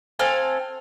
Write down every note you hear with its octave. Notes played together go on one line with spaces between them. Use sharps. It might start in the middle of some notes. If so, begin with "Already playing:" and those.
C4 A4 F5 G#5